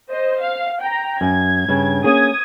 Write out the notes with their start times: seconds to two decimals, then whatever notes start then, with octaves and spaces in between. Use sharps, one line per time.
0.11 C5 D#5
0.41 F5
0.82 G5 A#5
1.21 F#2 G#6
1.68 G2 C#3
2.04 A#3 C#4 G#4 D#6 G#6